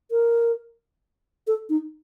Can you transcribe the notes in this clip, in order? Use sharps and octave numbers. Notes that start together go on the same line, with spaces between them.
A#4
A4
D#4